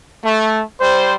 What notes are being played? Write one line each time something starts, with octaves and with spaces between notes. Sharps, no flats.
A3
G3 C5